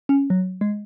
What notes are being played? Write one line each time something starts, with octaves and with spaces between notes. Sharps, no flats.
C#4
F#3
G#3